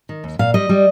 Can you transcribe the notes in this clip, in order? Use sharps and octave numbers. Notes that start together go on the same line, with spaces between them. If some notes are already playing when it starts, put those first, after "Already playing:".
D#3
D#2
A#2 F5
G3 D#5
G3